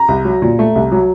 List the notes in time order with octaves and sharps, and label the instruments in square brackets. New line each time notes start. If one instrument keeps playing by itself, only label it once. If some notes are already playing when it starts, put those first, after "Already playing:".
Already playing: [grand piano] A#5
C2
F#3
A#2
A3
C2
F#3